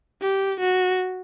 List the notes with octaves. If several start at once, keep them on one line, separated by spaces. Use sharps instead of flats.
G4
F#4